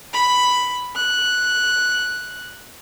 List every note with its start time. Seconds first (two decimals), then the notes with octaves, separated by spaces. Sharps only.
0.14 B5
0.94 F#6